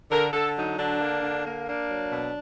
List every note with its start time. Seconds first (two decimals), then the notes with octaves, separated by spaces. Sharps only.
0.11 D3 A#4
0.33 D3 A4
0.56 F#3 D#4
0.79 D3 D4
1.00 A#3
1.23 D3
1.45 A#3
1.68 A#3 D4
1.90 F#3
2.12 B2